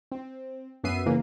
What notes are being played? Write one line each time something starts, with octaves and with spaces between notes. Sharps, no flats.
C4
F#2 B3 C#4 E5 C7 D#7
C#3 E3 A#3